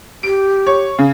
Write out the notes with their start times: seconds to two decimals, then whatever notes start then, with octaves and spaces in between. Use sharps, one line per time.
0.23 G4 D7
0.67 C#5
0.99 C#3